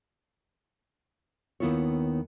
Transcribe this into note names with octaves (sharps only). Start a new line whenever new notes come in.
D#2 D#3 B3 E4 F4 C#5